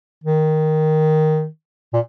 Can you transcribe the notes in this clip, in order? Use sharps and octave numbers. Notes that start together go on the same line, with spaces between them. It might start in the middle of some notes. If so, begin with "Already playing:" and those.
D#3
A#2